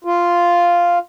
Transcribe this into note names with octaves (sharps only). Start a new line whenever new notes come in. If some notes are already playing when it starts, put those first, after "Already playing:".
F4